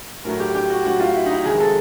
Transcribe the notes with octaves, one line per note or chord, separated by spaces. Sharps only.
A2 F#3 A3 A#4
G4
G4
F#4
A2 F#3 A3 F#4
F4
E4
D#4
E4
F2 C3 D#3 G#3 G#4
A4